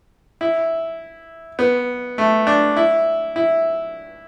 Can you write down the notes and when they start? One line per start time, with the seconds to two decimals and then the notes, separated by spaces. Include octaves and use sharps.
0.41 E4
1.59 B3
2.18 A3
2.47 D4
2.77 E4
3.36 E4